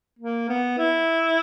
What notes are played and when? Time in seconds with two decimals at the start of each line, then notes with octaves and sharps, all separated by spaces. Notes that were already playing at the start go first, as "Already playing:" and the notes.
0.19 A#3
0.49 B3
0.78 E4